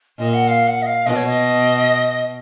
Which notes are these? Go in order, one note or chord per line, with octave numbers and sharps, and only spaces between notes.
A#2 D#5
F#5
F5
F#5
D#5
F5
B2 D#5
C#5
D#5